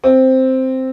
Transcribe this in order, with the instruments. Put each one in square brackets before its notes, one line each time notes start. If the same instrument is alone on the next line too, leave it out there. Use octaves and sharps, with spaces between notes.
[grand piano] C4